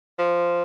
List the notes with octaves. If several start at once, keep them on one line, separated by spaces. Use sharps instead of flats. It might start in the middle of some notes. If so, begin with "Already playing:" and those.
F3